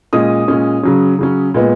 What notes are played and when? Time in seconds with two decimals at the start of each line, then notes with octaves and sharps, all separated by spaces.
0.13 A#2 G#3 C#4 D#6
0.48 A#2 G#3 C#4
0.83 C#3 F#3 C#4
1.19 C#3 F#3 C#4
1.54 A#2 G#3 B3